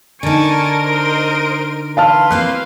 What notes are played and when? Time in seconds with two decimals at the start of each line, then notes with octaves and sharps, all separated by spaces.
0.23 D3 D#4 A#4 G#5 A5 C#6 D7
0.85 C5 D#5 C6
1.97 E3 B4 F5 A5 C6 F6
2.31 F#3 A#3 C4 F5 F#6